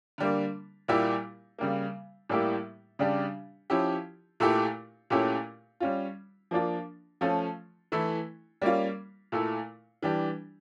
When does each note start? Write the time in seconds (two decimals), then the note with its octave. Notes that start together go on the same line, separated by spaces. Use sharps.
0.18 D3 G3 A#3
0.88 A#2 G3 A#3 E4 G4
1.59 C#3 G3 A#3
2.29 A2 G3 A#3 E4 G4
2.99 C#3 G3 D4 G4
3.70 F3 C#4 E4 G4
4.40 A#2 A3 E4 G4
5.10 A#2 A3 C#4 E4 G4
5.80 G3 C#4 F4
6.51 F3 A#3 D4 F4
7.21 F3 A3 C#4 F4
7.92 E3 A3 E4
8.62 G3 A#3 C#4 F4
9.32 A#2 A3 E4
10.02 E3 G3 D4 G4